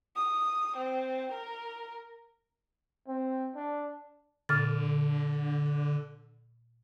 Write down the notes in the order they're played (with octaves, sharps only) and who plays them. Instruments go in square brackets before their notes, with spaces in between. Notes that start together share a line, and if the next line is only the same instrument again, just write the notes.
[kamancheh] D#6
C4
A#4
[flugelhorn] C4
D4
[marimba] A#2 F6 A6 [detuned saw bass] D3